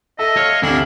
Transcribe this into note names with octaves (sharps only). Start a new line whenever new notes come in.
A4 D#5 E5
C#5 F5
D2 C3 D4 E4 F5